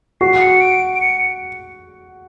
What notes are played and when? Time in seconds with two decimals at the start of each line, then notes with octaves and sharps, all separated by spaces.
0.21 F#4 C7
0.41 C#7
0.61 D7
0.96 D7
1.01 C#7